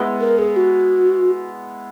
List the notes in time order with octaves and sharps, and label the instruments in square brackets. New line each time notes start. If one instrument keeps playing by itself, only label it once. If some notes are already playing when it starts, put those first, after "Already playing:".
Already playing: [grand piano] G#3 B3 E4
[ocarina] A#4
G#4
F#4